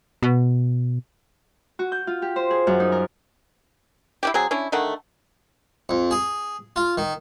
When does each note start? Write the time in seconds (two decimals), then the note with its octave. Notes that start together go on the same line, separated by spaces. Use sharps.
0.23 B2
1.79 F#4
1.92 G6
2.07 F4
2.22 G4
2.36 C5
2.50 G#4
2.67 F#2
2.80 D#4
2.92 A#4
4.23 E4 F#4 G4
4.34 F#3 C4 G#4
4.51 C#4 D4 E4
4.72 D3 D#3 A3 F#5
5.89 F2
6.11 G#4
6.76 F4
6.98 D#3